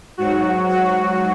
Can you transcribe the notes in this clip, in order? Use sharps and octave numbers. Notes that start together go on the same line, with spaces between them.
G#2 F#3 F#4
F#4